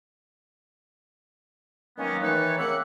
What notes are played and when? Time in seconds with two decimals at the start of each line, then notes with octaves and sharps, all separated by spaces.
1.98 D#3 F#3 G#3 A#3 B3 C#4
2.22 D#3 E3 A3 D#4 B4 C#5
2.58 C#3 A#3 C4 A#4 E5 F#5